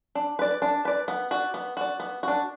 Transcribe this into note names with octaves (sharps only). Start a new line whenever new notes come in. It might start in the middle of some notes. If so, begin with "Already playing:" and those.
D4
B4 D5
D4
B4 D5
B3
F#4 D5
B3
F#4 D5
B3
D4 F#4